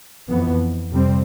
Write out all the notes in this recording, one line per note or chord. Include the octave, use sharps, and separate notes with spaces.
F2 E3 B3
F2 C3 G3 C4